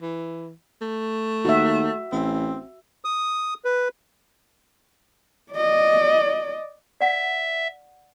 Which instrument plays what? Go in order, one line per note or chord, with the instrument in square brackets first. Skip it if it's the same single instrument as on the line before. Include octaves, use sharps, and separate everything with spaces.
[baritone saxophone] E3
A3
[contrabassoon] D#2 [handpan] F#4 E5
[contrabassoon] A1 [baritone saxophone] C4
[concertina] D#6
B4
[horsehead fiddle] D5 D#5
[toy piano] D5 F#5 [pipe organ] E5